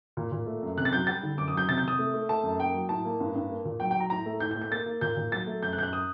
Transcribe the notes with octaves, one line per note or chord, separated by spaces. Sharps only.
A#2
A#2
A3
F#2
C3 F#6
A6
F#3 G6
G3 A6
D3
F#2 D6
D#6
F#3 G6
C3 A6
G6
C3 D#6
A3
A3
A3 A5
F#2
A#3 G5
F#3
A2 A5
A#3
G2
G2
A#3
A#2
F#3 G5
G5
F#3 A#5
A2 A#5
A3
A2 G6
G6
A3
G6
A#3 A6
A#3
A#2 G6
A#2
F#3 A6
A3
F#2 G6
F#6
F#2 G6
F#6
D#6